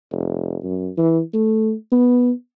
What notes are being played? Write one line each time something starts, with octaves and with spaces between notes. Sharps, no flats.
F1
F#2
E3
A3
B3